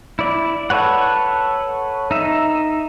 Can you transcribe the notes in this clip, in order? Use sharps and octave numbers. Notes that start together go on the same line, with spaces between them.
E4 D5
A4 B4 C#5 F#5
D#4 E5